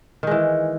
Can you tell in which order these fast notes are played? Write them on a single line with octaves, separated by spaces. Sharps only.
D#3 G#3 E3